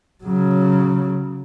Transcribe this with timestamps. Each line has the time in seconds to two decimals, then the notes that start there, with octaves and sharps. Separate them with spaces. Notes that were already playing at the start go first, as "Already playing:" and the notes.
0.24 C#3 F#3